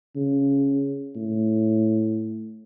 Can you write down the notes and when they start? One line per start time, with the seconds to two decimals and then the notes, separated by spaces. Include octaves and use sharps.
0.15 C#3
1.16 A2